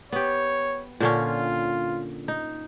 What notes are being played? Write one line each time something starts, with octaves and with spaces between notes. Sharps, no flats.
B3 G4 C#5
A#2 D3 C#4 F4
D#4